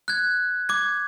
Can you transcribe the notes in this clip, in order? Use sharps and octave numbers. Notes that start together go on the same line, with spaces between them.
F#6 G#6
D6 G#6